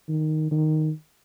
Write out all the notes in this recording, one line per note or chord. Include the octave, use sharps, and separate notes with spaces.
D#3
D#3